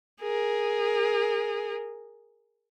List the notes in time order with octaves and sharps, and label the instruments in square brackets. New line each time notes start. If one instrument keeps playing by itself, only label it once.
[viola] G#4 A#4